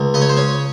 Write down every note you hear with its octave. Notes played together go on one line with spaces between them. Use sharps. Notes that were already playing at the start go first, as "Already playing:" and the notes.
Already playing: C#2
C#3 D#5
C#5
C5
C#4 C#5